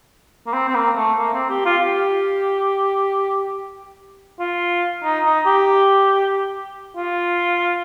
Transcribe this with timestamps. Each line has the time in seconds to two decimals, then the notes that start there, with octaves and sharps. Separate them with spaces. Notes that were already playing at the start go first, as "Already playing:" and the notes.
0.47 A#3
0.53 C4
0.69 C4
0.75 A#3
0.96 A3
1.18 A#3
1.34 C4
1.50 G4
1.66 F4
1.82 G4
4.39 F4
5.04 D#4
5.25 D#4
5.46 G4
6.96 F4